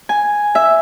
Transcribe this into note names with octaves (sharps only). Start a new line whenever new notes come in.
G#5
E5